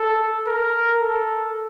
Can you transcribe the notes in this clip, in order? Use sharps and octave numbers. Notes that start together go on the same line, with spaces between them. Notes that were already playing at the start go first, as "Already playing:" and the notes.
Already playing: A4
A#4
A4